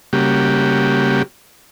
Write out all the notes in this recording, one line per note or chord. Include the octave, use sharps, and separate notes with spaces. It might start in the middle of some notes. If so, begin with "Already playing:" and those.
C#3 G3 A#3 F#4 G4